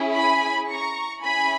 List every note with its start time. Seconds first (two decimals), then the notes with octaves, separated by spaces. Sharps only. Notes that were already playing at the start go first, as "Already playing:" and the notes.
Already playing: C#4 E4 G#4
0.15 G#5 B5
0.69 A#5 C#6
1.22 C#4 E4 G#4 G#5 B5